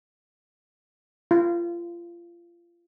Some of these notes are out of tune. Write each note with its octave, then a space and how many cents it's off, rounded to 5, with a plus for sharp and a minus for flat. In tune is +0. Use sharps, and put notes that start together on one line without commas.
F4 -30